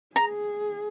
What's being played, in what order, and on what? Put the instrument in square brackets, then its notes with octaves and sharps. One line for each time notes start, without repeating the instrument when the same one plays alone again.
[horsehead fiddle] G#4 [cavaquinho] A#5